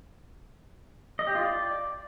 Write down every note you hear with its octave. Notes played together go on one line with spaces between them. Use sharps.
D#5
G4
F4
D5